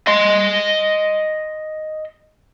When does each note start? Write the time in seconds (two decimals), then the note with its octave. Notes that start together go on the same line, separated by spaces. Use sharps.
0.07 D#5 C6